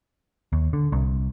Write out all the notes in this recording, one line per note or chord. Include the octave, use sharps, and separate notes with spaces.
D#2
D3
C2